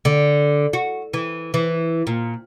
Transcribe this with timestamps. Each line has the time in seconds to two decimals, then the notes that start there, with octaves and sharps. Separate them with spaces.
0.05 D3
0.73 F#4
1.14 E3
1.54 E3
2.07 A#2